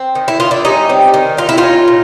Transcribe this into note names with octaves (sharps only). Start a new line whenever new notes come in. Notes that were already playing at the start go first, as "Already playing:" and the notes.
Already playing: C4
D#3
E4
D#3 F4
D4 E4
G3 C#4 D#4
C4
D#3
A#3 F4
E4
D#4 F4
C#4
A#2